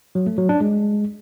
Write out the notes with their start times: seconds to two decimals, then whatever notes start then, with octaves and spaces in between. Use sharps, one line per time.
0.15 F#3
0.27 A3
0.38 F#3
0.49 D4
0.60 G#3